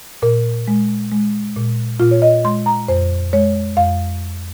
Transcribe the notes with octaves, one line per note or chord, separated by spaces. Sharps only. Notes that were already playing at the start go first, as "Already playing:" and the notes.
A#2 A#4
G#3
G#3
A#2
A#2 F4
C#5
D#5
G#3 C6
A#5
F2 C5
G#3 C#5
F2 F5